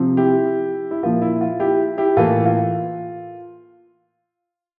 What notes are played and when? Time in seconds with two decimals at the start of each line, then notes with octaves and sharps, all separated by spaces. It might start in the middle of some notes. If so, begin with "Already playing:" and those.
Already playing: C3 F3 C4
0.17 E4 G4
0.91 E4
1.03 A#2 F3 A#3 F4
1.22 E4
1.41 F4
1.59 E4 G4
1.97 E4 G4
2.17 A2 E3 A#3 F4 A4
2.46 F4